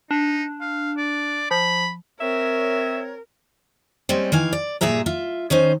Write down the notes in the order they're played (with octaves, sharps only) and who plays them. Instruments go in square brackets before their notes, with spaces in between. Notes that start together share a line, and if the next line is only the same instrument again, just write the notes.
[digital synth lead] D4 [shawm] D#4
[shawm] F5
D5
[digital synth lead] F3 [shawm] B5
[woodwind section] C4 C#5 [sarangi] A#4 [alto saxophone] E5
[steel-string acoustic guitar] G3 G#3 C4 C#4
D#3 E3 F5 G#5
D5
G2 A#2 G#4 E5 A#5
F4 E5
D#3 C#4 D#4 C5